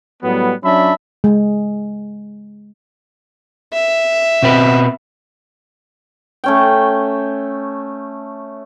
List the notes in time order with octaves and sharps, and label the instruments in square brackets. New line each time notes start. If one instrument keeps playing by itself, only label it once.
[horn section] A2 F#3 G3 B3
F#3 C#4 D4 E5 A5 B5
[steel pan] G#3
[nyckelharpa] E5
[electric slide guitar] B2 C4 B4
[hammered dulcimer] A3 C#4 G5